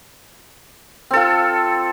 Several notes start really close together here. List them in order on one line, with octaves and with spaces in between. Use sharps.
C4 A4 F4